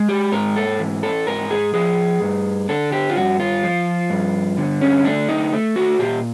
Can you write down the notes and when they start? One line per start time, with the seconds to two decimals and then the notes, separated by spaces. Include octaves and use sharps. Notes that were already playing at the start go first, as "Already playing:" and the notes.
Already playing: G#3
0.09 G4
0.32 G#2 A#4
0.56 A4
0.80 E3
1.03 A4
1.27 G#2 A#4
1.51 G#4
1.74 F3 G#4
2.22 G2
2.69 D3 A4
2.92 G4
3.10 F4
3.16 G2 F#4
3.40 F4
3.63 F3
4.10 G2
4.57 D3
4.81 C#4
5.05 A3 D4
5.29 D#4
5.53 A3
5.76 F#4
5.99 A#2 G4